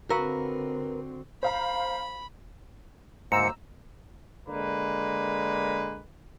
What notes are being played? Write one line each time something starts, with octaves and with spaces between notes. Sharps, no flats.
D3 C4 F#4 A#4 B4 F5 A#5 E6
C5 F5 A#5 B5
D2 G#2 A#3 C5 A#5 E6 C#7
D3 G#3 A#3 B4